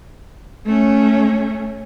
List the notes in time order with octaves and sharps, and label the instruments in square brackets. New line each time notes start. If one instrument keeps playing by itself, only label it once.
[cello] A3 C#4